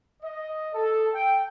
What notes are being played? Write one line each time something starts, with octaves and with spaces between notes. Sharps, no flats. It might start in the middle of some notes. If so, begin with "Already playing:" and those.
D#5
A4
G5